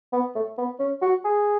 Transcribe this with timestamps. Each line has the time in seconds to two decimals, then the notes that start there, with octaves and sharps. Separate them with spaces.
0.13 B3
0.35 A3
0.58 B3
0.79 C#4
1.02 F#4
1.25 G#4